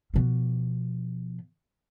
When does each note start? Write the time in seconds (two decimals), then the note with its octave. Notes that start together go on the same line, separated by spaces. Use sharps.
0.14 B2 F3